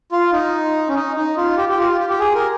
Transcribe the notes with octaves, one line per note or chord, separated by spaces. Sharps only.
F4
D#4
C#4
D#4
D#4
F4
G4
G4
F4
G4
G4
G#4
A#4